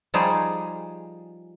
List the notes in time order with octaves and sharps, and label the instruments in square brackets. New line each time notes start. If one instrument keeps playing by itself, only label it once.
[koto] F3 G3 D#4 G#4